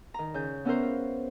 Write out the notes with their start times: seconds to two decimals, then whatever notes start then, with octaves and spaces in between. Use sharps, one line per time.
0.14 D#3 A#5
0.34 C#3 G6
0.65 B3 C#4 E4 F#4 A#4 C5
0.83 F4